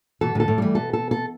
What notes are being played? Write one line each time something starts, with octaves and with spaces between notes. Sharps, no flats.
B2 E3 A4
A2 D3 A4
A2
E3 G3 A3
B2 A4
A4
A4